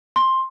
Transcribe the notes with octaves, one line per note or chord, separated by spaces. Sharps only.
C6